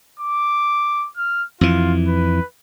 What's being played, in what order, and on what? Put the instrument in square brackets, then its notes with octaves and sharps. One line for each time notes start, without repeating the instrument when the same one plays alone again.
[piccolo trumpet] D6
F6
[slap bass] F2 E3 [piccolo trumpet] F4
[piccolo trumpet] B4